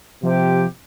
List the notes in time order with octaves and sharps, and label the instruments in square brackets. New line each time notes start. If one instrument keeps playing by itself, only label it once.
[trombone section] C3 [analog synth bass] F3 [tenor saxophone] G4